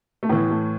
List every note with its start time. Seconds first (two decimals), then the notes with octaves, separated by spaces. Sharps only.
0.23 A3
0.29 A2 E3 B3
0.50 A3